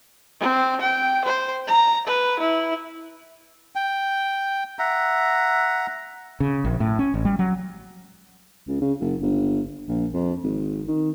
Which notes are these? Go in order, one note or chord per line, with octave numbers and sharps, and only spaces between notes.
C4
G5
C5
A#5
B4
E4
G5
E5 F#5 A#5
C#3
A#1
A2
C#4
A1
G3
F#3
C#2
C#3
F#1
G1
A#1
F2
G#1
D#3